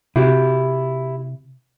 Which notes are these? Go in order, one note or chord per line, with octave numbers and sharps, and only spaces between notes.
C3 E4 F#4 G4